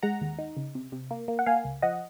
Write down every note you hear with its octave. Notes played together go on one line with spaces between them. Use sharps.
G#3 F#5 A#5
D#2
D#4
C#3
C3
C3
A#3
A#3
F#5
A#3 F5 G#5
C#2
F3 D#5 F#5